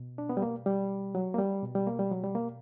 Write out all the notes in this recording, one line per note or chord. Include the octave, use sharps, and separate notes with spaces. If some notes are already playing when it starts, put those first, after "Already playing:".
Already playing: B2
D4
B3
G3
A#3
G3
F#3
A#3
G3
B2
G3
A#3
G3
F#3
G3
A#3